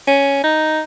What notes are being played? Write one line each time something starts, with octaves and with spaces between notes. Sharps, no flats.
C#4
D#4